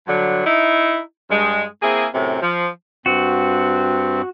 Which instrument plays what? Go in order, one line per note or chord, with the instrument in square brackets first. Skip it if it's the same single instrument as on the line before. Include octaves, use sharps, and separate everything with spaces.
[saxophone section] G2 D3 F#3
D#4 E4
G2 G#3
A#3 C4 E4 G#4
F#2 A2 C3
F3
[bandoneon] G2 C4 [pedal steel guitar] F#4